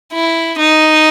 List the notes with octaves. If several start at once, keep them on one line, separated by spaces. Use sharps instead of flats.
E4
D#4